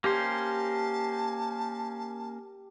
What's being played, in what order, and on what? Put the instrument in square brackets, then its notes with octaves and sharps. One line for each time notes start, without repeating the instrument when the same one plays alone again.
[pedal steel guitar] A#3 C#4 C5 [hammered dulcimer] G4 [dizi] A5